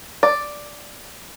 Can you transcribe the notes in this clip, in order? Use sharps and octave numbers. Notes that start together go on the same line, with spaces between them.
D5